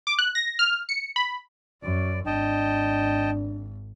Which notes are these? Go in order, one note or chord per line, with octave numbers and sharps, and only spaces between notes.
D6
F#6
A#6
F6
C#7
B5
F#2 D5
G#1 D4 D#5 G5 A5